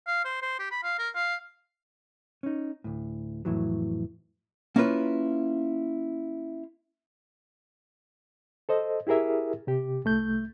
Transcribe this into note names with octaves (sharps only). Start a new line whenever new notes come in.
F5
C5
C5
G4
B5
F5
A#4
F5
C#4 D#4
D2 A2
F2 A2 E3 F#3
A#3 C#4 E4 F4 B4
A4 C5 D#5
E4 G4 G#4 A#4 E5
C3 G4
C2 A3 G6